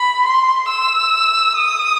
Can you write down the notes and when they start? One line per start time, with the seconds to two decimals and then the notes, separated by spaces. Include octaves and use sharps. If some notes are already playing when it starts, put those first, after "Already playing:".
Already playing: B5
0.25 C6
0.68 E6
1.56 D#6